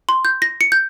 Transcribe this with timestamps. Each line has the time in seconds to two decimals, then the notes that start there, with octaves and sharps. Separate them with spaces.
0.09 C6
0.25 G6
0.42 A#6
0.61 C#7
0.72 G6